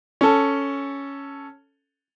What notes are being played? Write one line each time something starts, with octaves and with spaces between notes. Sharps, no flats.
C#4 A4